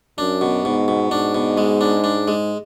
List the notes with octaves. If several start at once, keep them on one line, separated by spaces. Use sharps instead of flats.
F#2 D4
B2
G#2 B2
B2
G#2 D4
B2
G#3
D4
D4
G#3